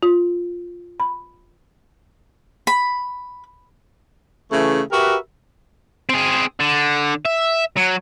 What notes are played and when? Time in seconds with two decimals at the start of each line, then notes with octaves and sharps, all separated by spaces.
0.02 F4
1.00 B5
2.67 B5
4.52 C#3 E3 A3
4.91 F#4 G4 A#4 B4 E5
6.09 C4 G#4
6.60 D3
7.25 E5
7.77 F#3